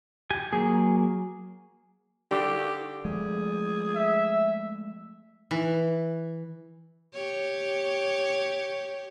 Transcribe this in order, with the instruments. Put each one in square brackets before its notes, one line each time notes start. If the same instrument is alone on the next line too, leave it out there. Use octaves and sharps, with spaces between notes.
[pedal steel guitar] G4 G#5
[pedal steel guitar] F#3 A#3 [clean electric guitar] G#4
[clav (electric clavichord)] D3 [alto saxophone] G4
[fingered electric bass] F3 G#3 A3 [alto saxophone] G#4
[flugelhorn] E5
[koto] E3
[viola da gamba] G4 C#5